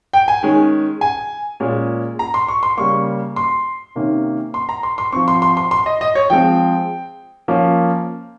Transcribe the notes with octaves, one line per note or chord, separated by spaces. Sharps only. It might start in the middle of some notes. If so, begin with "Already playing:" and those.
G5
G#5
D#3 G#3 C#4
G#5
A#2 G#3 C#4
A#5
C6
C#6
C6
C#3 G3 A#3 C#6
C6
C3 D#3 A#3 C#4
C6
A#5
C6
C6
F3 C4 C#6
C6
C6
C6
C6
D#5
D#5
C#5
F3 G#3 C4 G5
F3 A#3 C#4